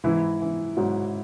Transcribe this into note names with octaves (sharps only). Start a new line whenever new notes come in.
G#2 E3 E4
E3
G#2 F#3 F#4